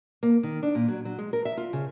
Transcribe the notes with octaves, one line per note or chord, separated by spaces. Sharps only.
A#3
D#3
D4
A#2
F#3
F#3
G#3
A#4
E5
F4
C#3